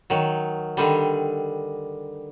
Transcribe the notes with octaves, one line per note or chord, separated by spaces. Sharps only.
D#3 F#3
D3 D#3 G3